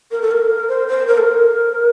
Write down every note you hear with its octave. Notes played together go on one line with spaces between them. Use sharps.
A#4
A4
A#4
C5
C5
A#4
A4
A#4